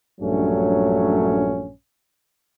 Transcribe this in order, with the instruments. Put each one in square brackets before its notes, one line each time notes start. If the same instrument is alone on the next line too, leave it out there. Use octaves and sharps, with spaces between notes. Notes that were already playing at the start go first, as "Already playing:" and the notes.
[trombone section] A#1 G2 F#3 A3 C#4